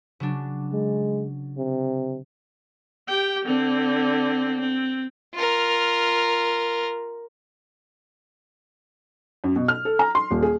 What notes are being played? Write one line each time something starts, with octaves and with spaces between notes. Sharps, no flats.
C#3 F#3 D4
G#3
C3
G4 G5
D3 C4
C4
F4 A#4
F#2
B2
F6
A4
A#5
C6
D#1
G#4